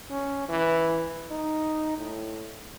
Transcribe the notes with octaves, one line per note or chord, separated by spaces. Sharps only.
C#4
E3
D#4
A2